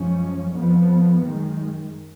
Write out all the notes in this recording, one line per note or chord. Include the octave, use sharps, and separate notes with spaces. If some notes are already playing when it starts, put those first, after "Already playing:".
Already playing: F#2 F3 G#3 C#4
F2 F3 B3
F#2 D#3 G#3